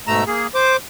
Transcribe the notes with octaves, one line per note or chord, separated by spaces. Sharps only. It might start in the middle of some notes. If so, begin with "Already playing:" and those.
G#2 B2 A3 A#5 E6
A#3 G#4
C5 D6